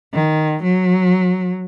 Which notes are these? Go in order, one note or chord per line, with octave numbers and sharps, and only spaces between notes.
D#3
F#3